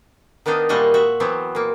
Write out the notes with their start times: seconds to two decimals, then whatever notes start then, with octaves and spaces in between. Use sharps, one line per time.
0.46 D#3 B3 D4 D#4 F5
0.69 A#2 G3 G#3 F#4 D#5
0.94 F#4 E5
1.20 E3 F#3 B3 C4
1.55 A#2 A#3